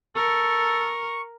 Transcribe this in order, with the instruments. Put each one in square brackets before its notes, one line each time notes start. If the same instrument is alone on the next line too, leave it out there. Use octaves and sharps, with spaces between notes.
[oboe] A4 [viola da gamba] A#4 [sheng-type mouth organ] C#6